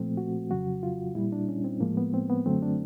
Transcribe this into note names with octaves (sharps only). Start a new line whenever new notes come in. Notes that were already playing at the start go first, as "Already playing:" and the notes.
Already playing: A#2 F3 A3 C4
F#4
F2 C#3 F#3 F#4
F4
A#2 G3 E4
D4
C#4
C4
A2 F3 G#3 A#3
B3
C4
B3
F#2 D3 F#3 A3 C4
D4